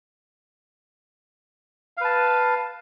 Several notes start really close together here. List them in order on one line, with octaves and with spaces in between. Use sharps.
F5 B4 A5